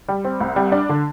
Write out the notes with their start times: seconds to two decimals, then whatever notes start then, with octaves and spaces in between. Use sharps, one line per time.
0.08 G3
0.25 C4
0.41 C2
0.56 G3
0.72 D4
0.89 D3